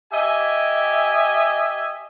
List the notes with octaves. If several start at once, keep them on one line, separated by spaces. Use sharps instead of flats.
G4 D#5 E5 G#5